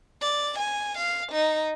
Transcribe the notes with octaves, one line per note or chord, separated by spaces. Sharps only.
D5
G#5
F5
D#4